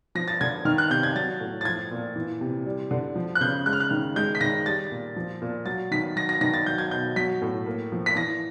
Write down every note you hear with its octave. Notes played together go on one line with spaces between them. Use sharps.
F3 A#6
A6
D3 G#6
D#3 F6
F#6
C3 G6
G#6
F#3 A6
A2
A6
F3 G#6
A#2
E3
C3
G3
D3
F3
F#6
C#3 G6
G#3 F#6
F6
F#6
D#3
G#3 G6
B6
D#3 A#6
G3 A6
A#2
F3
A#2
F#3 A6
D#3 B6
F#3 A#6
A#6
D#3 A#6
A6
F#3 G6
G#6
B2 G6
F#3 B6
A2
A#3
F3
B6
E3 A#6